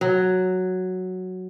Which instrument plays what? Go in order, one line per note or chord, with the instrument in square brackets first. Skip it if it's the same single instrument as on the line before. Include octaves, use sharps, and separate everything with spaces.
[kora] F#3